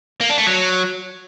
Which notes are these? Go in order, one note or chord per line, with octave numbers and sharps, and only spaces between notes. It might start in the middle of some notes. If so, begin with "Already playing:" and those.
A#3
D4
A3
F#3